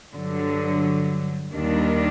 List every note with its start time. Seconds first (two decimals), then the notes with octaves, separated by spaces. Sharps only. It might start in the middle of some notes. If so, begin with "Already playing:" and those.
0.13 G2 D3 F#3
1.53 D#2 D#3 G3 D4